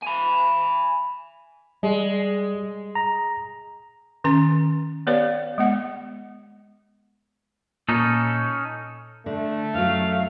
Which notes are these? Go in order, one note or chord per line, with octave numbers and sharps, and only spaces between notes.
G#5 B5
G3 G#3
A#5
D#3 C#4 A#5
B3 G4 B4 C#5 D5 F5
G#3 B3 F#5
A#2 C#4 D#4 A4
D3 A3
F#2 F#3 F5